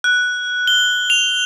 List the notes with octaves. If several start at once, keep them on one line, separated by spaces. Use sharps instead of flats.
F#6
G7
F7